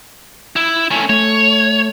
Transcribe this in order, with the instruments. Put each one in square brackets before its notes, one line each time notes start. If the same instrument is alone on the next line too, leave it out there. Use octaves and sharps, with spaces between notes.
[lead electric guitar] E4
A3 C#4
[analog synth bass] A3 [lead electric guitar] C#5